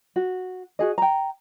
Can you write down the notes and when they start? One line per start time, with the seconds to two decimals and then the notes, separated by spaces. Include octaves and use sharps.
0.16 F#4
0.79 F#4 G#4 D#5
0.98 G5 A#5